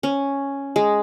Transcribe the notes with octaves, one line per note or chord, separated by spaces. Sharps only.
C#4
G#3